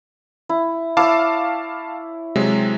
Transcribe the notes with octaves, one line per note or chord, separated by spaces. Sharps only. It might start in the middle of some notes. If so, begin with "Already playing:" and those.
E4
E4 C#5 F5 A5 D6
C3 F#3 G#3